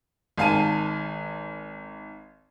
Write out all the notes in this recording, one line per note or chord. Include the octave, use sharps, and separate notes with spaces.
G#1 D#3 F5 G#5 A5 D#7